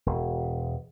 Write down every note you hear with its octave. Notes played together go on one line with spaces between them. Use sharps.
E1